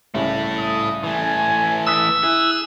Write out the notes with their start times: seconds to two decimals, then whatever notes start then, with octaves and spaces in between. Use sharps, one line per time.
0.15 C2 C#3 A3 E4
0.59 D#6
1.04 E3 A3 G#5
1.87 D#6 E6 F#6 B6
2.23 E4 G#4 F#6